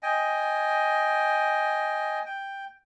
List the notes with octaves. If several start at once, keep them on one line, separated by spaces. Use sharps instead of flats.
D#5 G5 G#5
G5